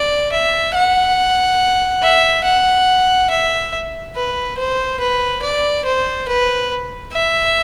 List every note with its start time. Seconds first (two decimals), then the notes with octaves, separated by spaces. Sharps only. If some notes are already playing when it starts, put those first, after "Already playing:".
Already playing: D5
0.32 E5
0.74 F#5
2.02 E5
2.45 F#5
3.30 E5
4.16 B4
4.58 C5
5.00 B4
5.43 D5
5.86 C5
6.28 B4
7.13 E5